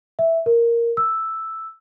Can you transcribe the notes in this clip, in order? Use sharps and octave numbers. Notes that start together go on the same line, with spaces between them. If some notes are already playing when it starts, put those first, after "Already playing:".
E5
A#4
E6